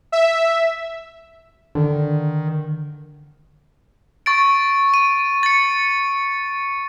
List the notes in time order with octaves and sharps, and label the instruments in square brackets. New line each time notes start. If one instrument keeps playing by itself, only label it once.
[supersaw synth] E5
[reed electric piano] D3 [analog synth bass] D#3
[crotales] C#6 A6 D7
D#7
A6 C#7